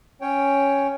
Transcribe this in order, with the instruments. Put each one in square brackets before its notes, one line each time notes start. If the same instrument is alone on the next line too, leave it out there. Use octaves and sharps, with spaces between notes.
[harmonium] C#4 C#5 G5